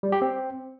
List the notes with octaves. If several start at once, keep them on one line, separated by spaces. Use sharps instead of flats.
G3
G4
C4